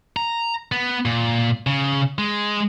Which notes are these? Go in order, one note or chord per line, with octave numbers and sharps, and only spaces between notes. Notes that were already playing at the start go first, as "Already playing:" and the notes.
A#5
B3
A#2
C#3
G#3